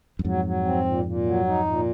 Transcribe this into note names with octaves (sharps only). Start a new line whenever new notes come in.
F#2
F2 G#2 F#3
F#3
C4
A#2
A#2
F#3
D#4
A#2